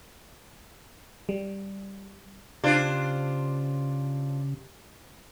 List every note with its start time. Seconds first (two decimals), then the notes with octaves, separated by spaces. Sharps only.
1.29 G3
2.64 C#3 D4 F4 G4 C5